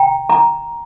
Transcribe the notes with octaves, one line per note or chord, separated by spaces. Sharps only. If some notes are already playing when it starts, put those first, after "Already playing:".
Already playing: G5 A#5
A#5